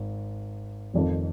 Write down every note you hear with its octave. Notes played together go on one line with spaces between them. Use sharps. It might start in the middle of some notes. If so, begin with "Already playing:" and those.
Already playing: G#1
F1 F2 D#3